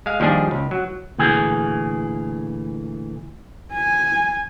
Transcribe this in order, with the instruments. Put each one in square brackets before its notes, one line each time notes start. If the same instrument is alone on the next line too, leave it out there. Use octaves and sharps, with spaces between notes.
[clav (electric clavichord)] G#3 F5
D#2 F3 G3 D4 G#4
C#2
F#3
[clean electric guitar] D2 A#2 E3 G#4
[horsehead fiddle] G#5